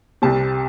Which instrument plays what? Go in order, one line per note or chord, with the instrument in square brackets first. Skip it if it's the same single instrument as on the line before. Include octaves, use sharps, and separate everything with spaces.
[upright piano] C2 C3 G3 A5